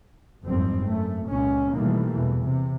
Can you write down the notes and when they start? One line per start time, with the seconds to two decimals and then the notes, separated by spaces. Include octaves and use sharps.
0.46 F#1 F2 G#2 G3 C4
0.86 F#2 A3
1.29 C#2 A#2 C#4
1.74 B2 D#3 E3 G3 A3 A#3
2.12 E2 B2 E3
2.43 C3